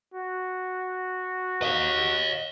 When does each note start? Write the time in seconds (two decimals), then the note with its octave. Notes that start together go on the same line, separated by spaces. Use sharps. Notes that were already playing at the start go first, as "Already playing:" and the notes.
0.14 F#4
1.62 D#5 F5